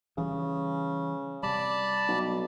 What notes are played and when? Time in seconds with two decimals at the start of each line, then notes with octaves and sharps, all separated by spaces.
0.18 C#3 E3 G3
1.43 C3 G3 D5 A5 B5
2.08 B1